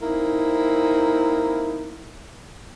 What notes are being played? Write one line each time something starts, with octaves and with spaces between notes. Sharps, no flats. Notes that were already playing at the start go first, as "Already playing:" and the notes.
A#3 C4 D#4 E4